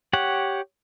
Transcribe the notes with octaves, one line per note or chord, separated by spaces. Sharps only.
G4 C#5 F#5